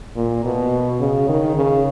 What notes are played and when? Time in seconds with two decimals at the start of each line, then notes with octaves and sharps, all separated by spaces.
0.16 A#2
0.44 B2
1.00 C#3
1.28 D#3
1.56 C#3